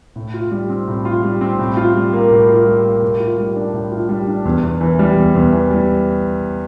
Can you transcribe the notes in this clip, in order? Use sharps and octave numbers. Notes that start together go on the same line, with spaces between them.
A2
F4
G3
C4
A2
F4
G3
C4
A2
F4
G3
A#3
A2
F4
G3
A#3
A2
F4
G3
D4
A2
F4
G3
D4
E2
E2
E3
G3
E2
E2
E3
G3